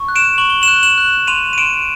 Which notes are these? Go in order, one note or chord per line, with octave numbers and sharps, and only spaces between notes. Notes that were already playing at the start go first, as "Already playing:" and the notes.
Already playing: C#6
F#6
D7 E7
C#6 F#7
G7
E7 F#7
F#6
E7 F#7
F#6
C6 D#7 F7
D#7
C6 D7 E7